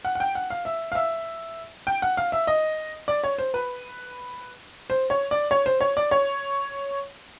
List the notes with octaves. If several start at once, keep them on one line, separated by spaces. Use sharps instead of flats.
F#5
F#5
G5
F#5
F5
E5
F5
E5
G5
F#5
F5
E5
D#5
D5
C#5
C5
B4
C5
C#5
D5
C#5
C5
C#5
D5
C#5